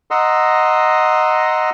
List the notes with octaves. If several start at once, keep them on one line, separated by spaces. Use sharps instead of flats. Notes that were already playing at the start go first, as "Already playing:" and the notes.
D#5 F#5 A#5 C6 D#6 E6